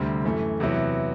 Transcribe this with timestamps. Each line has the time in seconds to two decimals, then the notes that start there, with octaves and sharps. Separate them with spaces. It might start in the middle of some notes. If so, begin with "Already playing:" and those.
Already playing: D2 C3 G3 C4
0.24 F#2 E3 A3
0.60 E2 C3 F#3 B3 E4